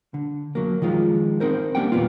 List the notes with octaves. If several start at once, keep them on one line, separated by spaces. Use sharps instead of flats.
D3
F#3 A#3
D#3 F3 G#3 F4
C4 D#4 A#4 C5
G3 A#3 C#4 D4 F#5 G5
D#2 A#2 F#3 B3 C4 F4